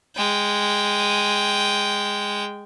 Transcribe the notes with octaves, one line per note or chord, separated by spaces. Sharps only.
G#3 G5